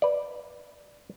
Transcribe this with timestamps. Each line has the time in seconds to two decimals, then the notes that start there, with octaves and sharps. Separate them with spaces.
0.02 B4 D5